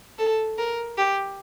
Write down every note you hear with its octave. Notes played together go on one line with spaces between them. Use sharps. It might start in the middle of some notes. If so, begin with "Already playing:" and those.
A4
A#4
G4